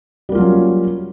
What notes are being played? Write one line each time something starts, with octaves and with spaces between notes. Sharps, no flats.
F#3 G3 A#3 C#4 F4